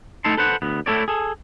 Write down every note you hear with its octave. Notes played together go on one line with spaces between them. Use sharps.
A3 D#4 E4 A4 A5 C6
A4 B4 C5 F#5
D2 B3
A3 E4 A4 C#5 D5
G#4 A4